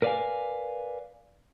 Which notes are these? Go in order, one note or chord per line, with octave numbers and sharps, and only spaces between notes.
A#4 B4 D5 D#5 F5 G#5